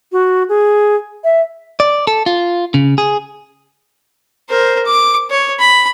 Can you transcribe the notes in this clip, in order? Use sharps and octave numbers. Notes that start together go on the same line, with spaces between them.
F#4
G#4
E5
D5
A4
F4
C#3
G#4
A#4 C5
D6
C#5
B5